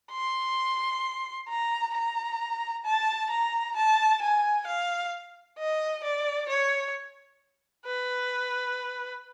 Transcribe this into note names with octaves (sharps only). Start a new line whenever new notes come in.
C6
A#5
A#5
A5
A#5
A5
G#5
F5
D#5
D5
C#5
B4